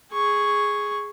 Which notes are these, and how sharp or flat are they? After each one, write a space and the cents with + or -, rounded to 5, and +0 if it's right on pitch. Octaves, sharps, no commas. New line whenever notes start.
G#4 +0 C#6 +0